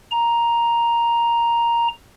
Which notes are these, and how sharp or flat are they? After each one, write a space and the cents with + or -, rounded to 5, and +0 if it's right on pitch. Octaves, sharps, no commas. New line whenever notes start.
A#5 +5